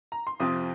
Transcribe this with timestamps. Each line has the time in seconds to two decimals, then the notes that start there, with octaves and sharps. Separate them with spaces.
0.12 A#5
0.27 C6
0.40 F2 C3 F3 C4 D#6